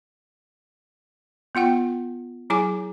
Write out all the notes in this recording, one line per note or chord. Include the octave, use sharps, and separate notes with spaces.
B3 F4 F#5 G5
F#3 E4 G#4 G#5 D6